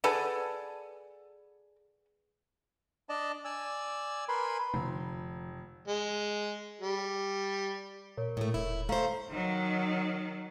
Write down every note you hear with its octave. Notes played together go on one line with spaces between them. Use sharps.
G#4 A4 B4 D5 F#5
D4 D5 D#5 A5
D5 G#5 E6
A#4 B4 G#5 B5 C6
F1 D3 F3
G#3
G3
A#2 A#4 C#5
A2 A3
E1 E4
A3 C5 F5 A#5
D#3 F#3